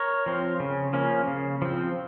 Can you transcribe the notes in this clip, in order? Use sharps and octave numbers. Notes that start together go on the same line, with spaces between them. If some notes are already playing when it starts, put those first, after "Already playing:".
Already playing: A#4 C#5
F3 C4
C#3
F3 A#3 C#4
C#3
F3 C4